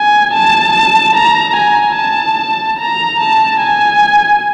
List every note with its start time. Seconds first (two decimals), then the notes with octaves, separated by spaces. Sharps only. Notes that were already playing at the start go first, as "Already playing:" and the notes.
Already playing: G#5
0.33 A5
1.15 A#5
1.56 G#5
1.97 A5
2.79 A#5
3.20 A5
3.61 G#5